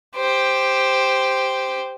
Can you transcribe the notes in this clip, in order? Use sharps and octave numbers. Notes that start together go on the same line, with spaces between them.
G4 C5